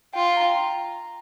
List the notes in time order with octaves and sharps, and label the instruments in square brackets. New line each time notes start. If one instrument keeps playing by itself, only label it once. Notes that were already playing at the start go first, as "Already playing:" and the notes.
[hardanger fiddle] F4 [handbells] G5
[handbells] A#5